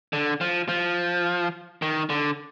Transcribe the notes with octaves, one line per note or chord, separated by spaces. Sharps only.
D3
F3
F3
D#3
D3